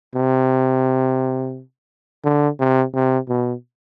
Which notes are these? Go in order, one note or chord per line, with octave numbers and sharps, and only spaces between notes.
C3
D3
C3
C3
B2